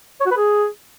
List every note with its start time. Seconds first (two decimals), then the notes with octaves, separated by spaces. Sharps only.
0.21 C#5
0.26 F#4
0.31 B4
0.37 G#4